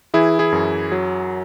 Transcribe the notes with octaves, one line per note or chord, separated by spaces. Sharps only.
E3 E4 G#4
E4 G#4
F#2
F#3